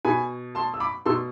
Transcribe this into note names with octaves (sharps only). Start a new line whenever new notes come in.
B2 G#5 B5
A5 C6
E6
B5 D6
B2 C6 E6